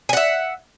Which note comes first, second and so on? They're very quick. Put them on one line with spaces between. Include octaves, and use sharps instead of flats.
G#5 F#5 E5